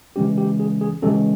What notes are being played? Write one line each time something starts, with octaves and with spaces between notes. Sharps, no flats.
C#3 E3 G#3 C#4 G4
G4
G#4
G#4
C#3 E3 G#3 C#4 G4 A4